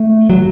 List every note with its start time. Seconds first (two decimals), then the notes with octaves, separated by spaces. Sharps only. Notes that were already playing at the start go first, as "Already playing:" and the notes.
Already playing: A3
0.30 F#3